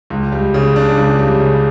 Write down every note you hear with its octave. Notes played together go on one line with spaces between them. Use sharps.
C#2
G3
C#3
D4
C#2
G3
C#3